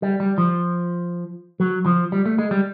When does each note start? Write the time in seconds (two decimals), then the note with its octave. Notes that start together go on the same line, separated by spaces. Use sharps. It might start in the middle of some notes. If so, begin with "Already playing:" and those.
0.02 G3
0.20 G3
0.38 F3
1.60 F#3
1.86 F3
2.12 G3
2.26 A3
2.39 G#3
2.51 G3